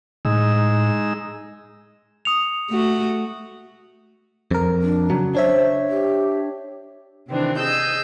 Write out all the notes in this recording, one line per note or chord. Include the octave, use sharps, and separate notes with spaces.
A2 G#3 D#4 E6
D#6 C#7 F7
A3 F#4
F2 A#4
D4
C#3 F#3
D4 C5 C#5 E5
G4
C3 D#3 E3 C4 D4
G#4 D#5 E6 G6